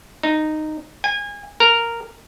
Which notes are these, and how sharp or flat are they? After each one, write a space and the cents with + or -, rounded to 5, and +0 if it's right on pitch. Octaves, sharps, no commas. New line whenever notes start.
D#4 -10
G#5 -30
A#4 -5